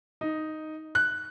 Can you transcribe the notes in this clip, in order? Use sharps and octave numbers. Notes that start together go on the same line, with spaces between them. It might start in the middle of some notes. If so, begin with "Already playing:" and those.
D#4
F#6